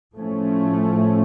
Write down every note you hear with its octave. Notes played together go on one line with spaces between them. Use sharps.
A2 F3 A3 C#4